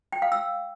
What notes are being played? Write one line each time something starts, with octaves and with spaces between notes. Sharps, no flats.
G5
F5
E6